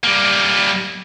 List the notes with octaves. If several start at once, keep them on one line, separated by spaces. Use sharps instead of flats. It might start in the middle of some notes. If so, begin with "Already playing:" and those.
G3 A#3